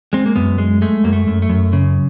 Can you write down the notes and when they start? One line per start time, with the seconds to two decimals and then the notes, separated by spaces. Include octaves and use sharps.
0.13 G#3 C4
0.26 A#3
0.36 F#2 B3
0.58 G#3
0.82 G#3 A3
1.04 F#2 A#3
1.13 A3
1.27 F#2
1.42 A3
1.49 F#2
1.73 C#3